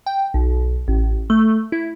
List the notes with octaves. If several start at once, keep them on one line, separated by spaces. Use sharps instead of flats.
G5
B1
A1
A3
E4